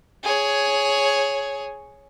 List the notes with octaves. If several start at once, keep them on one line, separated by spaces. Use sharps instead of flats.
G#4 C#5